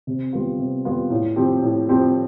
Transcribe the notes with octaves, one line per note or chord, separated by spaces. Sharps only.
C3
G3 B3 F4
C3
G3 B3 F4
A2
F3 C4 G4
A2
F3 C4 G4